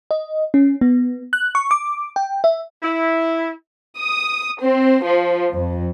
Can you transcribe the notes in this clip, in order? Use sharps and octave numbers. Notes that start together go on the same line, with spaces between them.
D#5
C#4
B3
F#6
C#6
D6
G5
E5
E4
D#6
C4
F3
F2